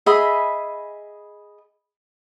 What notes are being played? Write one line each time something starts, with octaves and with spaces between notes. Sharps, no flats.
G#4 D#5 E5 B5